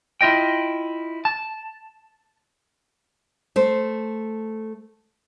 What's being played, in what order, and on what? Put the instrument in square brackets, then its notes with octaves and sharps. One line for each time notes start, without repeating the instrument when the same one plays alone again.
[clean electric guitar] E4 F4 D#5 G5
A5
[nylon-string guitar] A3 C5